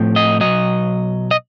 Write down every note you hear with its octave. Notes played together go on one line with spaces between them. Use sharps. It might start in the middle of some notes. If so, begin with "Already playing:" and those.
Already playing: A2 F3 A3 C4
D#5
B1 A2 F#3 D#5
D#5